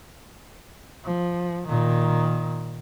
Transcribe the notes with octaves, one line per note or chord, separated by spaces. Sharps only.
F3
A#2 D#3